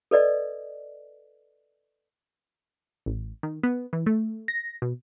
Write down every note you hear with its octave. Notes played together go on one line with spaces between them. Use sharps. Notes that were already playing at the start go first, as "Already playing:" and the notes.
A4 B4 D5 D#5
A1
D#3
B3
E3
A3
A#6
B2